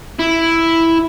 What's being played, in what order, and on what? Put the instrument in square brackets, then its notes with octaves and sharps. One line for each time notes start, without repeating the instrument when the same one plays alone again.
[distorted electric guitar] E4